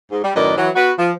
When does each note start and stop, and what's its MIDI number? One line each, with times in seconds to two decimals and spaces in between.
0.11 0.20 44
0.23 0.35 55
0.36 0.57 42
0.36 0.57 45
0.36 0.57 51
0.36 0.57 71
0.36 0.57 74
0.36 0.57 75
0.58 0.69 52
0.58 0.69 54
0.75 0.91 59
0.75 0.91 66
0.75 0.91 71
0.98 1.12 53